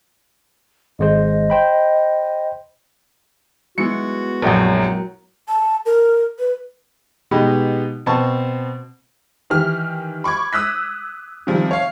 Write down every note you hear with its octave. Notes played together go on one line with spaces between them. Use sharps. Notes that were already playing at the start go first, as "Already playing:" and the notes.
G#1 G#3 C5 D#5
C5 G5 B5
G#3 B3 E4 F#4 C#7
A#1 F#2 F#3 A#4 G5 F#6
A5
A#4
B4
B2 G#3 B3 D#4 G4
B2 C4 A5 C#6
D#3 E3 G4 F6
B5 C#6 D6 G#6
D#6 E6 F#6 B6
C3 D#3 F3 G3
C#5 F5